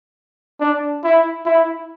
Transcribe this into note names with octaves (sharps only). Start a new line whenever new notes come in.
D4
E4
E4